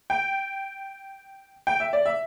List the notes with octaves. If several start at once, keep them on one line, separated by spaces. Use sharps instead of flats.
G5
G5
E5
D5
E5